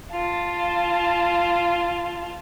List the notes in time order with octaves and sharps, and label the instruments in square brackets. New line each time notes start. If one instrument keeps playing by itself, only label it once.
[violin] F4 A5